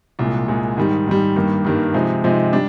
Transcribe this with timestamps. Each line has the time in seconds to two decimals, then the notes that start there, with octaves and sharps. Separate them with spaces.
0.19 C2 A#2 G#3
0.48 C2 A#2 G#3
0.77 G#2 D#3 G3
1.07 G#2 D#3 G3
1.36 G2 D#3 G3 A#3
1.65 G2 D#3 G3 A#3
1.94 C3 F3 G#3 D#4
2.24 C3 F3 G#3 D#4
2.53 G3 D4